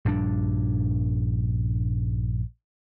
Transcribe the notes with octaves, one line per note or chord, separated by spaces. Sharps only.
A#1 G2 C#4 D4